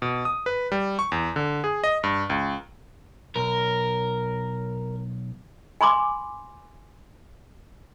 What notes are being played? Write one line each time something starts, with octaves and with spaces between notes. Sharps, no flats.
B2
D#6
B4
G3
C#6
E2
D3
G#4
D#5
G2
C#2
B1 A#4
G#5 B5 C6 D6